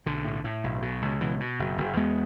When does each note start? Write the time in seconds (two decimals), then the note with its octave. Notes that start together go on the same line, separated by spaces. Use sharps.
0.06 B1 D3
0.25 A2
0.44 A2
0.64 B1
0.82 B2
1.02 C#2
1.21 B2 E3
1.40 B2
1.59 F#1
1.78 F#1
1.97 E2 G#3 B3